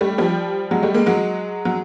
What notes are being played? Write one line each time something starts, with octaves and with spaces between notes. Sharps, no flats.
G3 A3
F3 G3
F#3 G#3
G3 A3
G#3 A#3
F#3 G#3
F#3